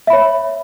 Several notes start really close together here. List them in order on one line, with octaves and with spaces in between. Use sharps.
E5 B5 C#5